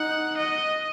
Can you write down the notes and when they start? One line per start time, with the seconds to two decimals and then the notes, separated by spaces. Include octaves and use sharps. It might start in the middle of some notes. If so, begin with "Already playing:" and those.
Already playing: D#4 F#5
0.37 D#5